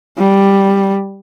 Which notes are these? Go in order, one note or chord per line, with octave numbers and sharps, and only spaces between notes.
G3